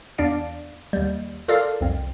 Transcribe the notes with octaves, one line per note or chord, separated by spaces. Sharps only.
E2 D4 D5 F5 D7
D#2 G3
F4 A4 A#4 D5 F5
C2 F2